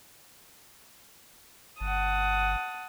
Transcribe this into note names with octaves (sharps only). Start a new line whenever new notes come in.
G1 F#5 A5 D#6